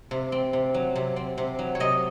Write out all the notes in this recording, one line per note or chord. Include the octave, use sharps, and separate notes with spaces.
C3
C4
C3
F#3
C3
C4
C3
F#3
C#5
C3 D#5